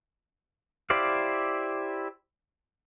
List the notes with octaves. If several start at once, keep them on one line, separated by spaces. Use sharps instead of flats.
E4 G4 C5 D5 F5